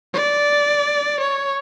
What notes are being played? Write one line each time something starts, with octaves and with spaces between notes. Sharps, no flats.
D5
C#5